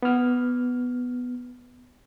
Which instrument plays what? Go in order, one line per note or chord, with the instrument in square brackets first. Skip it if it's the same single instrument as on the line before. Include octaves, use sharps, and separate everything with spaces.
[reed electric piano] B3 F6